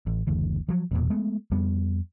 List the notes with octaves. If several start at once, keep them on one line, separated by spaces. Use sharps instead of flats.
A1
F#1 D2 E3
F3 F#3
E1 E2 A#2
G#3 A3 B3
F2 G3 B3